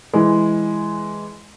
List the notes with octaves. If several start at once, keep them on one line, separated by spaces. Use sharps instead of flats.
E3 G#3